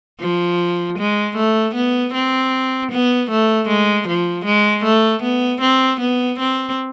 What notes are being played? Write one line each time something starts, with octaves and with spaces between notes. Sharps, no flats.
F3
G#3
A3
B3
C4
B3
A3
G#3
F3
G#3
A3
B3
C4
B3
C4